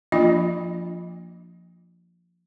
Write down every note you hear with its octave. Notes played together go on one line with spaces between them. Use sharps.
F3 A#3 D4 F4 D#5